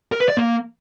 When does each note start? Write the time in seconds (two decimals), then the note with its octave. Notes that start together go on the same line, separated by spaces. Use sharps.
0.12 A#4
0.20 B4
0.29 D5
0.37 A#3